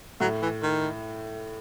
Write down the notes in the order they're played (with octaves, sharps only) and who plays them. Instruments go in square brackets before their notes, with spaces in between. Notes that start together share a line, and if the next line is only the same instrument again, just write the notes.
[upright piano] A2 [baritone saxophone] F#3
[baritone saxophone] E3
D#3